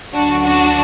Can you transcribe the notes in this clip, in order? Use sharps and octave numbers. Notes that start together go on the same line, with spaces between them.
D2 D3 F#3 D4 F#4
D4 F#4